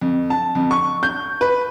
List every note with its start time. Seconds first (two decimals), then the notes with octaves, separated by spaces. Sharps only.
0.01 F2
0.30 A5
0.55 F2
0.71 C#6
1.03 G6
1.41 B4